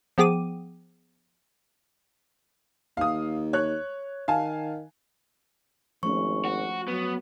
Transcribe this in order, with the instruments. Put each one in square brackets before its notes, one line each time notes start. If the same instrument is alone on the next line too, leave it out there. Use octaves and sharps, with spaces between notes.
[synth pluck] F3 B3 G#4 G5 D6 D#7
[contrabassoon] D#2 [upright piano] F5 D#6
[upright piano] C#5 F#6
[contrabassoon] D#3 [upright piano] F5 G#5 A5
[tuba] G#1 [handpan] F3 A3 C#4 [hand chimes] C#6
[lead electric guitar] F#4
[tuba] F#3 [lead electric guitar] B3